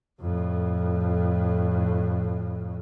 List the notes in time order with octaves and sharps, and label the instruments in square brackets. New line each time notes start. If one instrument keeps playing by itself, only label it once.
[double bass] F2 A2